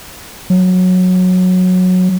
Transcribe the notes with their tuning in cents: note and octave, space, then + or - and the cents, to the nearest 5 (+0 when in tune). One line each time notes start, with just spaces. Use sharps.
F#3 -15